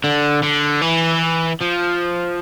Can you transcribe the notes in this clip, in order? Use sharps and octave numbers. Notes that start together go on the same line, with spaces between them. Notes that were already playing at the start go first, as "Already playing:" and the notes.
D3
D3
E3
F3